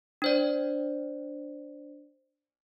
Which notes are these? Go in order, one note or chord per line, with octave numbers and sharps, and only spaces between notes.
D4 C5 D5